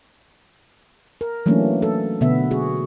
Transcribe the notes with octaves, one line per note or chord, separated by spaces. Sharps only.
A#4
E3 F#3 A3 A#3 C#4 D4
A4
B2 D3 B3 E5
F#4 G#4